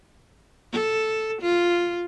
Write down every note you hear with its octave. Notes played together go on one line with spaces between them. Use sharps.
A4
F4